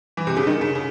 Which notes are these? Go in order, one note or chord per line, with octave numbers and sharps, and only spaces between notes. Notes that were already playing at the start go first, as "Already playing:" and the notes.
E3
C3
C#3
D#3
C#3
C#3